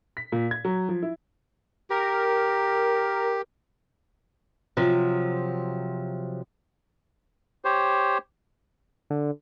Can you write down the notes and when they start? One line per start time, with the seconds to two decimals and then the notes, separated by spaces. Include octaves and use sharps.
0.17 B6
0.32 A#2
0.51 G#6
0.65 F#3
0.89 F3
1.02 E4
1.90 G4 A#4
4.77 C3 F3 F#3
7.65 G4 C5 C#5
9.10 D3